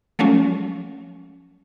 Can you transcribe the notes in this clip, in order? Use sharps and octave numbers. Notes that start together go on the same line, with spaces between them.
F3 F#3 G#3 A3 C#4